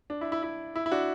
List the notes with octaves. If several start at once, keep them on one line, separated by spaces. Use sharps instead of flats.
D4
E4
E4
E4
E4
E4
D4 F#4